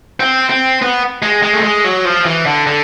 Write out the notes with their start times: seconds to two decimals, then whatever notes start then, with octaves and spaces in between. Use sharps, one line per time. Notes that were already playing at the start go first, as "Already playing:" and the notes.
0.20 C4
0.50 C4
0.82 B3
1.22 G#3
1.43 G#3
1.53 A3
1.64 G#3
1.84 F#3
2.05 F3
2.25 E3
2.46 D3
2.67 D3